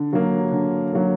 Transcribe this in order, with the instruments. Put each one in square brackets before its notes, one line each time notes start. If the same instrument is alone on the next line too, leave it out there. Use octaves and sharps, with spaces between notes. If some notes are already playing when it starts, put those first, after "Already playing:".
Already playing: [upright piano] D3
F#3 A#3
D3
F#3 A#3